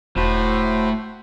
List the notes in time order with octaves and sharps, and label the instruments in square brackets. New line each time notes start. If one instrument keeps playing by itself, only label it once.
[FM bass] E1 [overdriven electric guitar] A2 [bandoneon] F#4 C5 B5